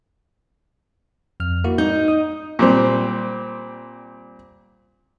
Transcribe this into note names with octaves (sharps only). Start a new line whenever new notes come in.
F2 F6
A#3 E4 F#4
D#4 G6
D#6
A#2 G3 C4